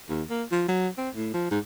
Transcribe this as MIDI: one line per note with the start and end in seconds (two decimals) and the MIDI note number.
0.09 0.23 39
0.30 0.44 58
0.51 0.63 53
0.68 0.88 54
0.98 1.09 60
1.15 1.30 45
1.34 1.50 53
1.51 1.59 44